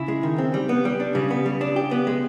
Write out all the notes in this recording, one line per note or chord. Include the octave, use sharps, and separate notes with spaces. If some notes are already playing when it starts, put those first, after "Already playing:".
Already playing: C#3 E4
G#3
D#3
C4
G3
B3
G3
D4
C#3 G3
B3
G3
D4
G4
B3
G#3